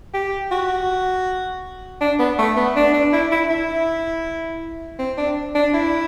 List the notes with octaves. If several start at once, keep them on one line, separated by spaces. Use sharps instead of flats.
G4
F#4
D4
B3
A3
B3
D4
D4
E4
E4
E4
C4
D4
D4
E4